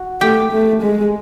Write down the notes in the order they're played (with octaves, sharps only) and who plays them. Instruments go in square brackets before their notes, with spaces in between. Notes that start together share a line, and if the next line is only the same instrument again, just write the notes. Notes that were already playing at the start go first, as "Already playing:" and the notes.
Already playing: [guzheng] F#4
[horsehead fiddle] A3 [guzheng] G4
[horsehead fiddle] A3
G#3